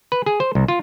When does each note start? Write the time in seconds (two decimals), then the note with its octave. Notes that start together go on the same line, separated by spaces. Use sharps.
0.12 B4
0.26 G#4
0.40 C5
0.55 C2
0.68 F4